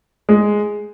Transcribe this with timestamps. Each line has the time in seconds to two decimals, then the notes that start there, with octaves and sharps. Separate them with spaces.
0.29 G#3